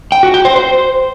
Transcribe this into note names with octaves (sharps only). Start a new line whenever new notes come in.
G5
F#4
G5
C5
C5